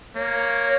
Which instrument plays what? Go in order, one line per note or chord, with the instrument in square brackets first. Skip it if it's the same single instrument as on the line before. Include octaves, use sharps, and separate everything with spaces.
[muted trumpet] A#3 [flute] C#5